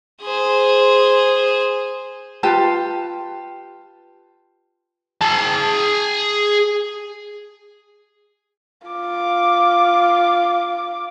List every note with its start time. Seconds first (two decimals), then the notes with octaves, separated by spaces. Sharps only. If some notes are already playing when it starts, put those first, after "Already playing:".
0.22 G#4 C5
2.43 F4 G4 B4 A5
5.21 G#4 A5
8.88 F4 D6